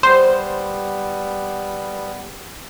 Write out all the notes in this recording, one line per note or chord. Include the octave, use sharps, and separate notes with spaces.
G3 B3 C5